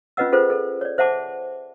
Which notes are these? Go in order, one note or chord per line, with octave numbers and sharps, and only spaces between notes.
C#4 F4 B4 D#5 F#5 E6
C#4 F4 G#4 A4 B4 C5
G#4 A4
C#5 D5
C5 E5 F#5 A5 D6